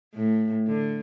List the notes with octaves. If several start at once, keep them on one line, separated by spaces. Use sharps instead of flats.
A2
D3